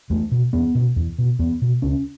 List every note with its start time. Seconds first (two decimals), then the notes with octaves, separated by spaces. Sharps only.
0.10 E2 A3
0.32 B2
0.53 E2 B3
0.75 B2
0.96 E2
1.19 B2
1.39 E2 B3
1.62 B2
1.82 C#2 C#4